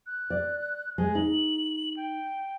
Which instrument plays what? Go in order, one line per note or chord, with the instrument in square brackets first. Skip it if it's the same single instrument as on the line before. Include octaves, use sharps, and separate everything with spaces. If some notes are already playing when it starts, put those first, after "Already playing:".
[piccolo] F#6
[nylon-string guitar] D5
[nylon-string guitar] G#3 [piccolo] G#5
[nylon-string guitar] D#4 [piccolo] F#7
[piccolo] G5